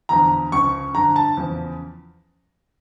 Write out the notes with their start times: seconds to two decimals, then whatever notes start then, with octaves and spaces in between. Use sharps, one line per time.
0.09 E2 D3 F3 A#5
0.52 C#2 C#3 F3 C#6
0.95 G2 D3 F3 A#5
1.16 A5
1.37 E2 C#3 F3